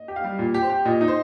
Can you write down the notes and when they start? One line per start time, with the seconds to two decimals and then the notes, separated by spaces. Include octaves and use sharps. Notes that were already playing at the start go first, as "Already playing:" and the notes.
Already playing: D#5
0.08 G4
0.16 F5
0.24 G3
0.39 A#2
0.54 G4
0.62 C5
0.70 G4
0.85 A#2 D#5
1.01 D#4
1.08 C5